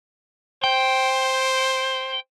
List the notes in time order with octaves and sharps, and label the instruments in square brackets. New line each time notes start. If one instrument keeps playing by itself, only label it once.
[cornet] C5 [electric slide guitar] G5